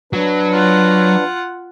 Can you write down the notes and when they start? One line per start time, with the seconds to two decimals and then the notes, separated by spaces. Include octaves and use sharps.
0.13 F#3 D4 B4
0.52 F4 F#5